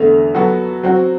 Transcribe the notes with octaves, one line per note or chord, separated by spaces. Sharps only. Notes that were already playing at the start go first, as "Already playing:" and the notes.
Already playing: E2 D3 A3
F#3 B3 F#4 A4
F#3 C4 F#4